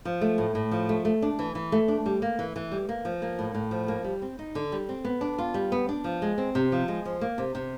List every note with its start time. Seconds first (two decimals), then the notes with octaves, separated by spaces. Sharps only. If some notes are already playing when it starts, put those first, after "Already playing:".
0.05 F3
0.21 A3
0.38 A2
0.55 A2
0.71 F3
0.89 A3
1.05 A3
1.22 D4
1.39 E3
1.55 E3
1.72 A3
1.88 D4
2.06 G3
2.22 A#3
2.39 E3
2.56 E3
2.72 G3
2.89 A#3
3.05 F3
3.22 A#3
3.39 A2
3.54 A2
3.71 F3
3.88 A#3
4.04 G3
4.22 C4
4.39 D#4
4.55 D3
4.72 G3
4.89 C4
5.05 B3
5.21 D4
5.38 F4
5.54 G3
5.72 B3
5.89 D4
6.04 F3
6.22 G#3
6.38 C4
6.55 C3
6.72 F3
6.88 G#3
7.05 F3
7.21 A#3
7.38 C3
7.55 C3